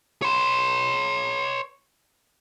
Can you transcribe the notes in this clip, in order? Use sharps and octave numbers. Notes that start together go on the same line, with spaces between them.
C#5 C6